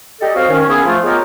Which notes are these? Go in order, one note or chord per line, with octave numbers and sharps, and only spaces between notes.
G4 A4 D5 D#5
C4 F#4 C#5 D#5 F5
D#3 C#4
A#3 B3 C#4 E4 G#4
F3 A3 F4
G#3 B3 F4 G4 A#4 C#5